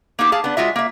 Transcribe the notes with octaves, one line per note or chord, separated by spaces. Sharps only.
A#3 B3 D#4 G4
G#4 F5 A5
B3 D4
G#3 F4 F#4 E5
A#3 E5